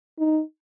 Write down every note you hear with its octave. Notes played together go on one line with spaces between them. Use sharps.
D#4